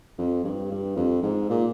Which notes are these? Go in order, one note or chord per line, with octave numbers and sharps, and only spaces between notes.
F2
G2
G2
F2
G#2
A#2